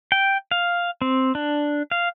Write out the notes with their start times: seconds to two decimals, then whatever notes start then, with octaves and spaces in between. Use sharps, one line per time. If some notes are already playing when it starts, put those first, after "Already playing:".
0.12 G5
0.51 F5
1.02 C4
1.35 D4
1.91 F5